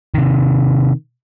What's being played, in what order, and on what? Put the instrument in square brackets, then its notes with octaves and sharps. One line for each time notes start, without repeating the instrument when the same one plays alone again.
[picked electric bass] C3 D#3